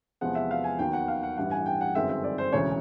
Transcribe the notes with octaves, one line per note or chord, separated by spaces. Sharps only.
E2 C3 F3 G#3 B3 F#5
E5
F5
G#5
D#2 D#3 F#3 B3 G5
F#5
F5
F#5
A1 G2 E3 G3 F#5
G#5
G5
F#5
G1 F#2 D#3 G#3 C4 E5
E5
D5
C5
E1 D2 C#3 E3 C#5